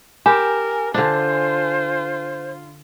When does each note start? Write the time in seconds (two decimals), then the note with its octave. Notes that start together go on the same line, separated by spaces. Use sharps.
0.26 G4 A#4 G#5
0.94 D3 D4 F4 C5